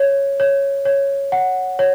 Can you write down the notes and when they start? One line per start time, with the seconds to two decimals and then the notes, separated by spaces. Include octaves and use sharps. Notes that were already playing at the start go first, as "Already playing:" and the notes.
Already playing: C#5
0.40 C#5
0.85 C#5
1.32 F#5
1.79 C#5